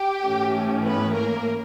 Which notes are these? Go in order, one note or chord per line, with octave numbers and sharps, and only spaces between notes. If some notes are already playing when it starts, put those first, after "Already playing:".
Already playing: G4
G#2 E3 A3 C#4
B3 B4
A#3 A#4